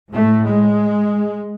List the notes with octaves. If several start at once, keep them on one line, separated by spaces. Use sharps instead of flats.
A2 A3
G#3